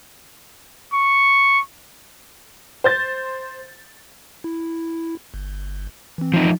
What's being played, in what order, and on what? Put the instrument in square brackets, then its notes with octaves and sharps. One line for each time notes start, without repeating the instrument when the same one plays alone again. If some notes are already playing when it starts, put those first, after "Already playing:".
[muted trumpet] C#6
[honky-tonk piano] C5 G6 A6
[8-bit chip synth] E4
G1
E3 C4
[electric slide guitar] F3 D#4